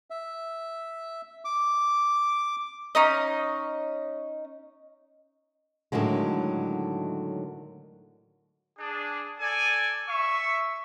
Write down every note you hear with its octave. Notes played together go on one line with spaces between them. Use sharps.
E5
D6
C#4 D#4 D#5
A2 D3 D#3 F#3 G#3
D4 G#4
A4 D5 G#5
E5 C#6